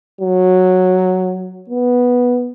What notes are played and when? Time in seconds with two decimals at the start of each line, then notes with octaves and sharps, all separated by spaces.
0.21 F#3
1.70 B3